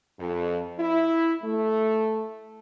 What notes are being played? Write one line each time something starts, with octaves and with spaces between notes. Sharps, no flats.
F2
E4
A3